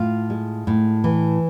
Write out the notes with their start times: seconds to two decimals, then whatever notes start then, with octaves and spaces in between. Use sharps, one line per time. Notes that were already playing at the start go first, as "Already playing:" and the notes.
Already playing: A2 F4
0.30 G#3
0.67 A2
1.04 E3